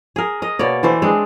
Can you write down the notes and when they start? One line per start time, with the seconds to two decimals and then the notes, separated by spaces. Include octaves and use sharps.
0.16 G#4 A#4
0.42 A#4 D#5
0.59 B2 A#3 C#5 D5
0.83 E3 A3 C5
1.02 G#3 C4 D4